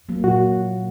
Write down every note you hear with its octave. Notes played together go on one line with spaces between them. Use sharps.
F#3 A#3
A#2 F#4